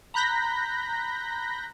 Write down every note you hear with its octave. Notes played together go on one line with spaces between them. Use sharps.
A#5 B5 F#6 G6 A#6 B6